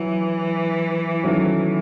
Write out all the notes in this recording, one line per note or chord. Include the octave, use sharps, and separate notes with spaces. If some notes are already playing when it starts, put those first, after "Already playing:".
Already playing: E3 F#3
D#3 F#3 A3 C#4 F#4